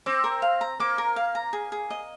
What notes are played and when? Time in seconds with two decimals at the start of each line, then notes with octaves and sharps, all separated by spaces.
0.06 C4 D6
0.24 A#4
0.42 F5
0.61 A#5
0.80 A#3 D6
0.98 A#4
1.16 F5
1.35 A#5
1.53 G#4
1.72 G#4
1.90 D#5